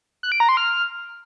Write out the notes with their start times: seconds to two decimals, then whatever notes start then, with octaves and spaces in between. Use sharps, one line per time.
0.23 F#6
0.32 D7
0.40 A#5
0.49 C6
0.57 F6